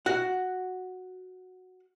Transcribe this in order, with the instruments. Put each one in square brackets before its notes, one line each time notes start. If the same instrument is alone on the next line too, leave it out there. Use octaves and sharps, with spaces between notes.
[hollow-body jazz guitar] F#4 F#5